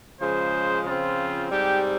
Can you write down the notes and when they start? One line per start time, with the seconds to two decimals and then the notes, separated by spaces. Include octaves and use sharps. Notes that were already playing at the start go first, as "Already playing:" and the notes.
0.20 C#3 F3 G#3 C5
0.85 C#3 F3 C4 F4
1.51 G#2 G3 C4 G4